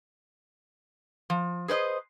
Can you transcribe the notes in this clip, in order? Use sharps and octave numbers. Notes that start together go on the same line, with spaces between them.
F3
G#4 B4 C5 D#5